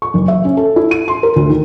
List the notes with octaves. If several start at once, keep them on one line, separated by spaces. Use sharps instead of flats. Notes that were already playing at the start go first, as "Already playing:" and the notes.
C#6
F#1
E5
C#4
A4
E4
D#7
C6
A#4
D2
D#3